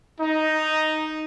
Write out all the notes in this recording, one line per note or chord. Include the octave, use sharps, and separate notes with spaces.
D#4